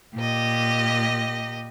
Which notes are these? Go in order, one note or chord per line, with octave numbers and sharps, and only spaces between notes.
A#2 G4 D#5